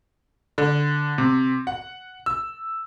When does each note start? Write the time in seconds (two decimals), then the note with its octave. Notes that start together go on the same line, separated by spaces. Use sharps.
0.58 D3
1.18 C3
1.67 F#5
2.26 E6